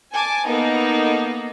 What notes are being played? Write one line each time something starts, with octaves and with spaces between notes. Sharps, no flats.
G#5 A5 D6
A#3 B3 D#4 A4 A#4